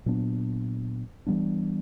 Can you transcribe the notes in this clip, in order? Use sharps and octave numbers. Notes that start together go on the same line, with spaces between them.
A#2 F#3 B3 D4
E3 G3 B3 D4